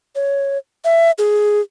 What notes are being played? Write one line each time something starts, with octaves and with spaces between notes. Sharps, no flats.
C#5
E5
G#4